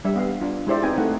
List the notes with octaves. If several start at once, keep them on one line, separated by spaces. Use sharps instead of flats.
G3 D4 E5
B3 F5
D4 F4
G#3 E4 G4 C5 D5 E5
C4 D#4 B4 G5 G#5
A3 D#4 F#5